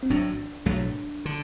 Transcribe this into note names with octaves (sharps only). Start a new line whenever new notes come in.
C4
A1 A2 F#3 D4
B1 A2 F#3 A3
D3